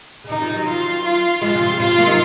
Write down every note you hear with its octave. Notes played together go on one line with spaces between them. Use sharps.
C#3
C3 D#3 D#4
C#3 F3
D#3 F#3
F4
F4
F3 G#3 F4
C#3
C3
C3 F4
F#3 A#3
D#4